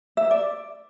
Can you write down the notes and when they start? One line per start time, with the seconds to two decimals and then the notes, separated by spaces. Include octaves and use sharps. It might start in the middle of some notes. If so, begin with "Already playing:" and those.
0.17 E5
0.31 D5